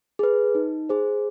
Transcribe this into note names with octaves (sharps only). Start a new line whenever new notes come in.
G#4 B4
D#4
G#4 C5